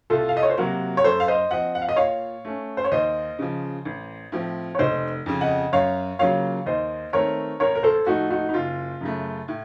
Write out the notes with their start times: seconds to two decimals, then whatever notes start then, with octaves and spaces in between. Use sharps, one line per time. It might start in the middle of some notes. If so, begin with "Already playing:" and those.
0.10 C2 F4 A4
0.29 F5
0.37 D#5
0.43 C#5
0.50 C5
0.58 C3 F#3 A#3 F#4 A#4
0.97 C#5
1.04 F#2 A4 C5
1.20 F5
1.28 C5 D#5
1.51 F3 C4 D#5 F#5
1.75 F#5
1.82 F5
1.89 D#5
1.96 A#2 C#5 F5
2.45 A3 C#4
2.77 C5
2.84 C#5
2.91 D#2 C5 D#5
3.39 C#3 F3
3.85 A1
4.32 A2 F3 C4
4.75 C#5
4.79 F1 C5 D#5
5.26 F2 C#3
5.41 D#5 F#5
5.73 F#2 C#5 F5
6.19 C#3 F#3 A#3 F4 C#5 F5
6.66 D#2 C5 D#5
7.13 D#3 A3 C4 A#4 C#5
7.60 A1 A#4 C#5
7.75 A#4
7.83 A4 C5
8.06 A2 F3 A3 D#4 F#4
8.30 D#4 F#4
8.49 D#4
8.54 F#1 F4
9.01 F#2 C#3 A3
9.48 A2